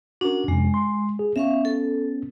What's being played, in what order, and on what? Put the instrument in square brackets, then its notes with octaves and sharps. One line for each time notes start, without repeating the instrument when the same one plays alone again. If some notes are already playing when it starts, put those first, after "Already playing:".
[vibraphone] C#4 D4 [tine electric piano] F#4 A#4
[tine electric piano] F2 C3 [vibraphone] G#3
[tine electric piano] C6
G#4
[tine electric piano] B3 C#4 [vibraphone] E5 F5 C#6
[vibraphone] A4